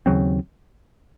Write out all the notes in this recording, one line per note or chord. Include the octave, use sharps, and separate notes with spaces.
D#2 C#3 F#3 C4